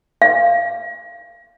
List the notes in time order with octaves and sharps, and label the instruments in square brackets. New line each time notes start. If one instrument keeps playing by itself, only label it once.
[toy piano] F5